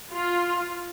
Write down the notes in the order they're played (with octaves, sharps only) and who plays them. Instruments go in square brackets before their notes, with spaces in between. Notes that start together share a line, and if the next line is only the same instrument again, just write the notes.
[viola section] F4